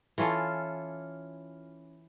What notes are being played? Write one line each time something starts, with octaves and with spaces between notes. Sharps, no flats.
E3 C#4 F4 A4